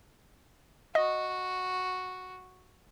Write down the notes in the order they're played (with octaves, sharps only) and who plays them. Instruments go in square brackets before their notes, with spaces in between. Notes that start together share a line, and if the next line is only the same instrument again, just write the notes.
[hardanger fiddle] F#4 [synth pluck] D#5